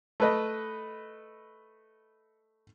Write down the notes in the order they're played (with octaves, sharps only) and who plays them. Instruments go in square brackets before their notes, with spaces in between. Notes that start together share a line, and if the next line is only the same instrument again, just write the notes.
[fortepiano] A3 B4 D#5